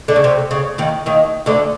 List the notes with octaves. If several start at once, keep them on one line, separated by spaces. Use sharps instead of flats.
D3
C#3
C3
C#3
D#2 D#3
D#2 D#3
D2 D3